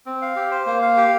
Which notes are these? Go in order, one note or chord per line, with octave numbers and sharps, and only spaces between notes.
C4
F5
G4
C5
A#3
F5
G4